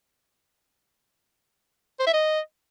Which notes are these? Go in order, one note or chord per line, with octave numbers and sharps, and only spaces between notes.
C5
E5
D#5